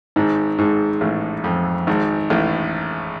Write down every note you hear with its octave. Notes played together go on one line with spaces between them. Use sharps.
G#1 G#2
G#1 G#2
A1 A2
F2
G#1 G#2
A1 A2